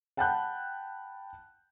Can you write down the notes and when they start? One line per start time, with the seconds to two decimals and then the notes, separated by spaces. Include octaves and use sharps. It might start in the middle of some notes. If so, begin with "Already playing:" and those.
0.17 F#5 G5 A5 B5 F#6 G6